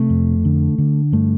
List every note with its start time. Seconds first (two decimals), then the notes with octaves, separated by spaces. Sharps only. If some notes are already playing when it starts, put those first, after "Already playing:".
Already playing: C3 A3
0.10 F2
0.45 D3
0.78 D3
1.12 G2 A3